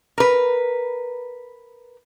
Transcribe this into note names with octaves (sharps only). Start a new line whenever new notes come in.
A#4 B4